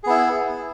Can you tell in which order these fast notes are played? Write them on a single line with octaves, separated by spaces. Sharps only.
G#4 B3 E4